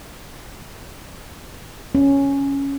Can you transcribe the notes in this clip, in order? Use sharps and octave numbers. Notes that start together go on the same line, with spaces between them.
C#4